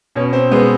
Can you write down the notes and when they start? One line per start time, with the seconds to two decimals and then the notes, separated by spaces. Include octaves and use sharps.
0.16 B2 C#4
0.33 C4
0.51 G#3 B3